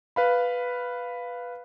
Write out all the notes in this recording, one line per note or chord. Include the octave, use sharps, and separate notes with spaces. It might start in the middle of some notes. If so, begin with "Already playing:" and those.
B4 F5 B5